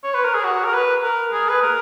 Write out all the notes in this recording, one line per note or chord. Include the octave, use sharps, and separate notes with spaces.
C#5
B4
A#4
G#4
F#4
A#4
B4
A#4
G#4
B4
A#4